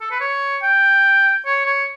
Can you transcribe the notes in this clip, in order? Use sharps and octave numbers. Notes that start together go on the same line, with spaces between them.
A4
B4
C#5
G5
C#5
C#5